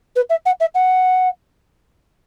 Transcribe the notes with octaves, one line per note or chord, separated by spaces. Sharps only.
B4
E5
F#5
E5
F#5